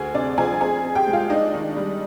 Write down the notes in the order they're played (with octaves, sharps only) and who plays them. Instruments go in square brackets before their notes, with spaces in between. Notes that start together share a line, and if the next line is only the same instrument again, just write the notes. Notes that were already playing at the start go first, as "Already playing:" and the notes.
Already playing: [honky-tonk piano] D2 G#4 G#5
C3 D4 D5
F3 G#4 G#5
C4 G#4 G#5
C4
G4 G5
G#3
F4 F5
D4 D#4 D#5
D#3
G3